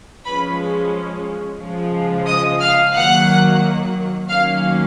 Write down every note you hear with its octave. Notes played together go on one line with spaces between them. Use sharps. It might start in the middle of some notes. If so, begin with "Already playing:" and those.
F3 G#3 C#4 B4 B5
C#3 F3 G#3
D#5 D#6
F5 F6
D#3 F#3 A#3 F#5 F#6
D#3 F#3 A#3 C#4 F5 F6